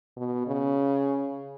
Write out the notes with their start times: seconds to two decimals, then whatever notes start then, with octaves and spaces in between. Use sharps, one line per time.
0.17 B2
0.47 C#3